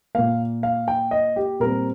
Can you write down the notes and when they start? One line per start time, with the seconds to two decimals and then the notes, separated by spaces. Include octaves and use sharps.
0.15 A#2 A#3 F5
0.63 F5
0.88 G5
1.11 D#5
1.36 G4
1.60 A#2 G3 C4 A#4